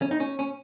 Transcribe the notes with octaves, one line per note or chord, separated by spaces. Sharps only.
C#4
D#4
C#4
C#4